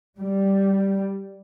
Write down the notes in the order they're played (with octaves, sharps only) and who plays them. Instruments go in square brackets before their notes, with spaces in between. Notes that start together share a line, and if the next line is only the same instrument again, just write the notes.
[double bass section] G3